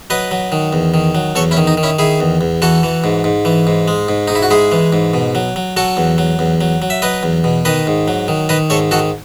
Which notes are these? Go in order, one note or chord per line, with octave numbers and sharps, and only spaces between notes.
F#3 B4 D#5
F#3
D#3
E2
D#3
F#3
E2 A4 C#5
C#4 E4
D#3
D#4
D#3
C#4 E4
D#3 E4 G#4
E2
E2
E3 F#4 A4
E3
G#2
G#2
E3
G#2
G#3
G#2
G#2 D#4
E4
F#4
G#3 E4 G#4
E3
G#2
B2
F#3
F#3
F#3 F#4 A4
E2
F#3
E2
F#3
F#3
E5
F#3 B4 D#5
E2
B2
D#3 B4 D#5
G#2
F#3
D#3
D#3 B4 D#5
G#2 A4 C#5
D#3 F#4 A4